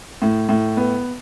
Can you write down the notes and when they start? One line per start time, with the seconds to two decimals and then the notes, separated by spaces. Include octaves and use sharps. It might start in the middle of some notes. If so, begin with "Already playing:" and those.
0.22 A2
0.49 A2
0.77 B3